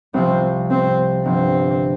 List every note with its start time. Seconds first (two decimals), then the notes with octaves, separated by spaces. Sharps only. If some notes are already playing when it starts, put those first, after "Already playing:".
0.14 C2 C3 F3 C4
0.71 C4
1.25 G1 G2 F3 C4